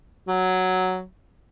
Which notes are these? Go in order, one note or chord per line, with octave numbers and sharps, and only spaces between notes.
F#3